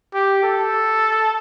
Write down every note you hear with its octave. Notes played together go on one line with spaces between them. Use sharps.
G4
A4